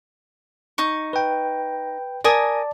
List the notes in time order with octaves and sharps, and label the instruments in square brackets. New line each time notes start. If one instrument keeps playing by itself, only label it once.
[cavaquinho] D#4 C#6
[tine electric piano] B4 G5
[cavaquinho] A#4 G#5 D#6 [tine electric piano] D5 A5